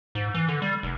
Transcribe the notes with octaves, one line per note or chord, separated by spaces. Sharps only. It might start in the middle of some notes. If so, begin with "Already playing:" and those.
G#2
E3
D3
G3
F1